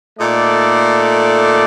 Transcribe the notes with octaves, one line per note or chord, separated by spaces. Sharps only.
A#2 A3 D#4 A4 D5